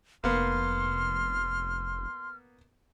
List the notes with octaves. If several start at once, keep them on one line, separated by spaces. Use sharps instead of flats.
F1 A#3 B3 C6 F6